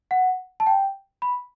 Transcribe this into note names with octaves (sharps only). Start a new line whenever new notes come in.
F#5
A5
G5
B5